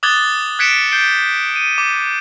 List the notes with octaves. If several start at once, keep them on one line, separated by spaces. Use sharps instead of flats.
D6 D#6 F#6 G#6 A6 G7
F#6 G#6 B6 C#7 D7 E7
G6 C7 D7 G7
D#7
D6